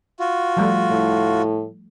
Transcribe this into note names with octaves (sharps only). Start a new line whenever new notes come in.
F4 F#4
F3 G3 A3
A2